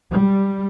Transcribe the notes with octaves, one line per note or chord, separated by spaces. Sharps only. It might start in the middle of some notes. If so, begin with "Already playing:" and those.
G3